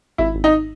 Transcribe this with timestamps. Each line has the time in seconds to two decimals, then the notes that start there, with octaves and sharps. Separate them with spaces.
0.18 G#1 E4
0.35 G#1
0.44 D#4